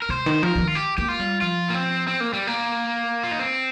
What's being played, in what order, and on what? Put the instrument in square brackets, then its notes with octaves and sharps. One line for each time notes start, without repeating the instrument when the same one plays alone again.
[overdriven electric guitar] A#4
[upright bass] C3 [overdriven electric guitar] C5
[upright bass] D#3
[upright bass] F3 [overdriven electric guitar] A#4
[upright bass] F3
D#3
[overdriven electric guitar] F4
G4
[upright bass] A#3 [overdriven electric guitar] G4
[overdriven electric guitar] F4
[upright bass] G3
[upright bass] F3 [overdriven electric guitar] F4
[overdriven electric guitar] A#3
C4
C4
A#3
G3
A#3
F4
D#4
C4